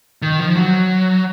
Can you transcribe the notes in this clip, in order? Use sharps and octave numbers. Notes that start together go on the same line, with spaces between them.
D#3
F3
F#3